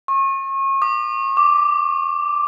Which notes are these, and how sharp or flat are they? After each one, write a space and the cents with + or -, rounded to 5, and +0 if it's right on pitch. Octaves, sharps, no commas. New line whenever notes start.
C#6 -35
D6 +40
D6 -5